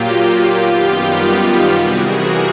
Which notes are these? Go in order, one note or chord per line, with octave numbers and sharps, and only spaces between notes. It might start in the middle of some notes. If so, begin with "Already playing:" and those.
Already playing: A#2 F#3 A#3 F4 G4
F#2 D#3 G3 B3 F4 G4
C3 E3 G3 F#4 G#4
G#4 A#4